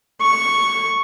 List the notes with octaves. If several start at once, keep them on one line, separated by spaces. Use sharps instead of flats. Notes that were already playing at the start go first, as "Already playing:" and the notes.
C#6